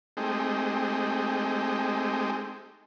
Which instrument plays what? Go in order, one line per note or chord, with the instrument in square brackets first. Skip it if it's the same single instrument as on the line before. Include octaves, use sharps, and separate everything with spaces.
[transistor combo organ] G#3 A3 C4 D#4 G4